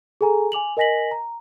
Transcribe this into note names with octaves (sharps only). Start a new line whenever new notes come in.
G#4 A4 G#5 A#5
G#5 D6 F7 F#7
A#4 D#5 G#5 A#6 B6 F#7
A#5